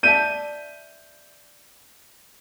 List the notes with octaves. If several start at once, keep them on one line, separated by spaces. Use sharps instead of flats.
D5 E5 A5 G6 D#7